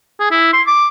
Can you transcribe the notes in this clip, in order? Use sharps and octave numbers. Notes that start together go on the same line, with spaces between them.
G#4
E4
C6
D6